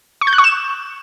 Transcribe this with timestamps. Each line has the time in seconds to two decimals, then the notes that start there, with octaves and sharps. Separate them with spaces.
0.21 C#6
0.27 G6
0.33 F#6
0.38 C#6
0.44 E7